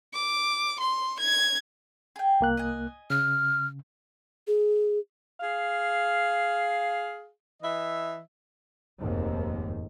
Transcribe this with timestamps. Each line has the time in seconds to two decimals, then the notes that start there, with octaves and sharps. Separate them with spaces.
0.14 D6
0.80 C6
1.20 G#6
2.16 G#4 G5
2.41 C2 A#3 F#6
2.57 D#5 G#5
3.10 C#3 F6
4.47 G#4
5.40 G#4 F5
7.62 E3 D#5 E5
9.01 F1 D#2 G#2